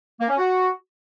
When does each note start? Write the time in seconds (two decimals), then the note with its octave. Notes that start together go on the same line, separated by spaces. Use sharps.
0.20 A#3
0.28 C#4
0.37 F#4